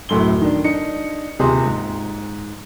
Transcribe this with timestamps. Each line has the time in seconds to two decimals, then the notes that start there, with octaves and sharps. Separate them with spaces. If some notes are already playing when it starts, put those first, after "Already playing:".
0.09 D1 F#2 A2 A3 C6 G7
0.41 D#3 D4
0.64 D4 D#4 C#7
1.39 D#1 C3 G#4 C6
1.66 G#2